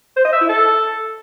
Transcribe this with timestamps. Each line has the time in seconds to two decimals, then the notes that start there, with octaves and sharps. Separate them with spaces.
0.17 C5
0.25 D#5
0.33 E5
0.41 E4
0.49 A4